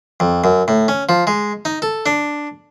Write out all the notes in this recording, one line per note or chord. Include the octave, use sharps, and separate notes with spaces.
F2
F#2
A2
C#4
F3
G#3
D#4
A4
D4